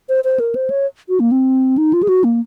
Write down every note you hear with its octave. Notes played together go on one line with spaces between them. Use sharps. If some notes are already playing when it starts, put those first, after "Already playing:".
C5
C5
A#4
C5
C#5
F#4
A#3
C4
D#4
F4
G#4
F#4
A#3